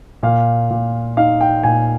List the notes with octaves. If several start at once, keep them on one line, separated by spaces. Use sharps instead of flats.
A#2 F5
A#2
D#4 F5
G5
A#2 G#5